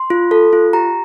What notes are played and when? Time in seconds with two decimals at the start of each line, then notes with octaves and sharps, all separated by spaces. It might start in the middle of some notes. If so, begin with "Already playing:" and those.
Already playing: C6
0.10 F4
0.31 A4
0.53 F4
0.73 G4 A#5